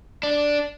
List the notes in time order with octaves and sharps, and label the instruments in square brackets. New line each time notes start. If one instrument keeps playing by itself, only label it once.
[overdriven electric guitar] D4